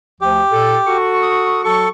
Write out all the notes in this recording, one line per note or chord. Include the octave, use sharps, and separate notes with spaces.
D2 F3 G4
A#2 A4
F#4 A4 C#6
D#6
F#3 F#4 A4 C#6